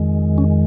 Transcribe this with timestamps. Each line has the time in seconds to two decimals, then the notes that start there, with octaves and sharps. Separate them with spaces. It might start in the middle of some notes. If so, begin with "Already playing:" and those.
Already playing: F2 D#3 G#3
0.38 C#4